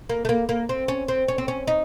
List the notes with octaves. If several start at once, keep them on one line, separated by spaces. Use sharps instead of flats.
A#3
A3
A#3
A#3
C4
C#4
C4
C#4
C4
C#4
D#4